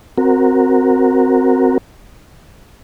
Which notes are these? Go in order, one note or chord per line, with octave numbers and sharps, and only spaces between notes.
C4 F#4 A#4